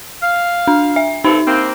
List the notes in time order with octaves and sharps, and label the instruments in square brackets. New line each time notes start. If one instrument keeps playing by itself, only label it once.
[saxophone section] F5
[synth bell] D4
E5
[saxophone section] G2 C4 A4 [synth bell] D#4
[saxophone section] A#3 C4